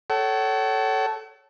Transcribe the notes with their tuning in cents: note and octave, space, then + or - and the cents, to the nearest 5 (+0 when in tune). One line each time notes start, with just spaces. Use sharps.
A4 -5 C#5 +0 F#5 +45